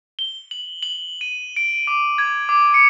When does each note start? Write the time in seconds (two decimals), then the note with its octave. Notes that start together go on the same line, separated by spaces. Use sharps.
0.19 G7
0.51 F#7
0.83 F#7
1.21 D#7
1.56 D7
1.87 D6
2.18 G#6
2.49 D6
2.74 C#7